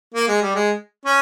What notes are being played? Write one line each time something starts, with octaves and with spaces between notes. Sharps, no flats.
A#3
G#3
G3
G#3
C#4